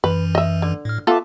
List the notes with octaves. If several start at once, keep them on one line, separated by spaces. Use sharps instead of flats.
F#2 E3 B4
D#5 E5
D3
A2 F6
B3 F4 A4 E5 A5 D6